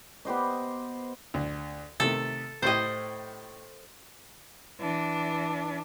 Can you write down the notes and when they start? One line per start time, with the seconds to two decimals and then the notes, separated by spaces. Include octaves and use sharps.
0.25 B3 G4 C5 D#5
1.34 D2
2.00 C3 D#3 A3 A4
2.62 A2 E4 G4 C5 D#5
4.81 E3 D4